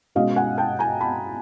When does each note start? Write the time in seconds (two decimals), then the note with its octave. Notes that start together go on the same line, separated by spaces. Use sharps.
0.15 B2 G#3 C#4 D#5 F5
0.36 F#5 G#5
0.58 G5 A5
0.79 G#5 A#5
1.01 A5 B5